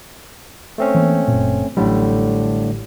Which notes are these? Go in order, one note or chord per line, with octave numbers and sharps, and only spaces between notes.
A3 C4 C#4
E3 F3 A#3
F#1 A#2
A1 A2 D3 F#3 G3